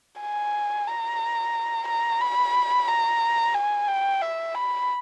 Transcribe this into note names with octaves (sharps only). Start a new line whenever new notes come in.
G#5
A#5
A#5
B5
A#5
G#5
G5
E5
B5